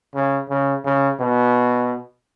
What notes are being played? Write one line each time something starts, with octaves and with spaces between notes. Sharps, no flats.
C#3
C#3
C#3
B2